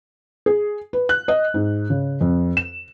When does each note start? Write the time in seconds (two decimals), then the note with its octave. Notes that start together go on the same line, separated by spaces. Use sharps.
0.46 G#4
0.93 B4
1.09 F#6
1.28 D#5
1.54 G#2
1.90 C#3
2.21 F2
2.57 E7